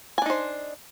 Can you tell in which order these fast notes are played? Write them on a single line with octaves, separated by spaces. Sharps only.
G#5 D4 D#4 C5